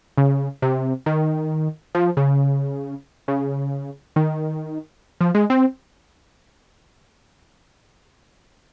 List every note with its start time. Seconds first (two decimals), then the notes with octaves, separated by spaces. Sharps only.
0.17 C#3
0.62 C3
1.06 D#3
1.95 F3
2.17 C#3
3.28 C#3
4.16 D#3
5.21 F3
5.35 G#3
5.50 C4